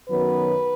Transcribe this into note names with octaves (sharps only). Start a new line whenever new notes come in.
F#2 D#3 F#3 B3 B4